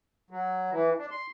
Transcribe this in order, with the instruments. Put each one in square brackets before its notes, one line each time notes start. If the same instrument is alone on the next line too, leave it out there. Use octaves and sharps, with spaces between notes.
[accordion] F#3
E3
D4
C6